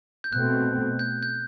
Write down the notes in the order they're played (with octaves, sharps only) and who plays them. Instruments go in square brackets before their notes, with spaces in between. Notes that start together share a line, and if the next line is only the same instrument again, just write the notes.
[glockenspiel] G6
[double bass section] B2 A3 C4 [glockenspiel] F#6
[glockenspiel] G6
G6